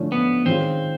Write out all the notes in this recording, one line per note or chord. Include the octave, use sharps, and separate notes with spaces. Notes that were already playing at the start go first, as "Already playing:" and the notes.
Already playing: D3 F3 A3 C#4
B3
D#3 G#3 C4 C#4 F4